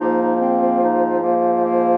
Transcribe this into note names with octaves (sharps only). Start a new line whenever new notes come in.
G#2 F3 A#3 D#4
D#4
D#4
C4
C4
D#4
A#3
A#3